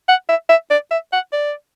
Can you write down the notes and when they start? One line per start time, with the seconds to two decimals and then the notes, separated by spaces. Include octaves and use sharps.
0.09 F#5
0.29 E5
0.49 E5
0.70 D5
0.91 E5
1.13 F#5
1.33 D5